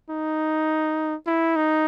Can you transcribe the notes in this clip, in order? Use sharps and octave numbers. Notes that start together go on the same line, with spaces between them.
D#4
E4
D#4